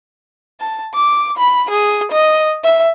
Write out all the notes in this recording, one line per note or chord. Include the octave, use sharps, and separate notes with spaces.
A5
D6
B5
G#4
D#5
E5